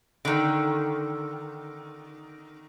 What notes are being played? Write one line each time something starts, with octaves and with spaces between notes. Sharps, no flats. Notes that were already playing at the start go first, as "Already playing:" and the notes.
D3 D#3